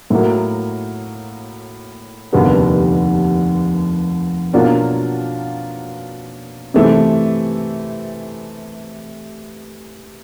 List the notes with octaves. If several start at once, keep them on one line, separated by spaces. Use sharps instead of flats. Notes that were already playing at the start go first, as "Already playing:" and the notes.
A2 F#3 A#3
F1 D#2 D3 G3 B3
B2 F#3 A#3 D4 F4
C3 E3 A3